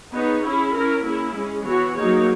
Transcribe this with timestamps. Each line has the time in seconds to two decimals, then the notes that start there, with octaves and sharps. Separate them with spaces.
0.13 B3 D#4 G#4 C#5
0.43 C#4 E4 G#4
0.75 C#4 E4 A#4
1.04 A#3 C#4 E4 G#4
1.36 G#3 C#4 G#4
1.66 E3 B3 F#4 C#5
1.96 F#3 A#3 D#4 G#4 C#5